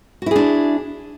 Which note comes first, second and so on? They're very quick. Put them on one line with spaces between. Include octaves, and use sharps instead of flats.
F#4 E4 G#4 D4